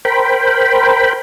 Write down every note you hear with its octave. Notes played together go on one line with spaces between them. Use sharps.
A#4 C5 G5 B5